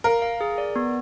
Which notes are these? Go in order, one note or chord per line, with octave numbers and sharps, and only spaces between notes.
A#4 F5
F5
G#4
D5
B3